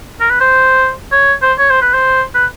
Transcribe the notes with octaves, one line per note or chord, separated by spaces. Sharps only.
A#4
B4
C5
C#5
C5
C#5
C5
B4
C5
B4